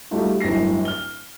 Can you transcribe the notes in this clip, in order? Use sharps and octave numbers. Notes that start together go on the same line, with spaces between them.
G3 A3 D#4 F4 F#4
D1 G1 A2 A#6 C7
F6 G7